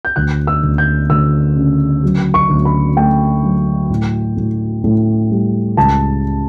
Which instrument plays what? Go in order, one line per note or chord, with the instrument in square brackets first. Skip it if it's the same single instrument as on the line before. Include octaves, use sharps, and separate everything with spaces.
[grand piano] G6
D2 F#6
E6
D2
G6
D2 E6
C#3
F#3
C#6
D2
B5
A3 G5
F#3
A2
A2
A2
G3
C#2 A5